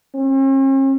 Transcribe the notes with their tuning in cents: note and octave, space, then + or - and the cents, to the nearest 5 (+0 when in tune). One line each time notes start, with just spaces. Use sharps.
C#4 -45